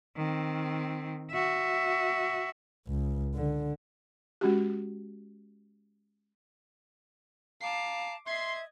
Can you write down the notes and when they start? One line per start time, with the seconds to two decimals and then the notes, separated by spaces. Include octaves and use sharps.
0.17 D#3 C4
1.31 F#4 E5
2.87 C#2
3.34 D3
4.41 G#3 C#4 F#4 G4
7.61 F5 A5 A#5 D6 C7
8.27 D#5 E5 C6 G#6